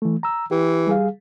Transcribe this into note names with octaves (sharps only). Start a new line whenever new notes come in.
E3 A3
A#5 E6
E3 G4
G3 G#4 F5